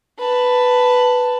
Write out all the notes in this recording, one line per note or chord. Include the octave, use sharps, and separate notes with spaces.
B4 A5